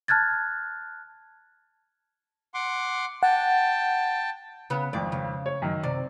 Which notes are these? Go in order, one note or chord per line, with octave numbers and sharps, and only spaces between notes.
A5 F6 F#6 G#6 A6
F#5 C6 D6
F#5 G5 A5
C#3 B3
G#1 F2 D5
C#3
C#5
F#2 D#3
C3 D5